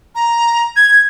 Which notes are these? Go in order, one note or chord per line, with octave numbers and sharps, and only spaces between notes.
A#5
G#6